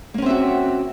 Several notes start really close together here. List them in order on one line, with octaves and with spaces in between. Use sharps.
A#3 C#4 C4 E5 F#4